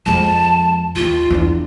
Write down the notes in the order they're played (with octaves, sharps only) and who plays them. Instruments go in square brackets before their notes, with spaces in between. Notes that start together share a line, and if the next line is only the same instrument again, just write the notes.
[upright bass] F2 G#3 [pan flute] A5
[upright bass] D#2 [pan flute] F4
[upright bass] E2 D4